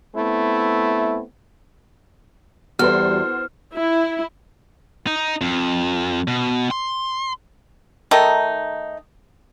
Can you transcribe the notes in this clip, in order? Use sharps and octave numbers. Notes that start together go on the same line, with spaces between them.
A3 B3 C4 E4
E2 G3 F#4 A4 C5 F6
E4
D#4
F2
B2
C6
D#3 A3 D#4